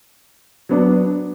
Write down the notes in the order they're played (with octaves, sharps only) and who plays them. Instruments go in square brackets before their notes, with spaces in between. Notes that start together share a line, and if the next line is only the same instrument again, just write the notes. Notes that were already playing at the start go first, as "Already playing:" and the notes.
[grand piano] F#3 B3 D4